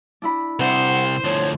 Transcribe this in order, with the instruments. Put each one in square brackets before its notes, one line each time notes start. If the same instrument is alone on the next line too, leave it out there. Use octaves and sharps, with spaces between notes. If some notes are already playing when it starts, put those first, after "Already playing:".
[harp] D4 E4 B5
[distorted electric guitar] C2 C3 [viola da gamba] C5 [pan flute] F#5
[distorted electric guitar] D2 F3 [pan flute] C#5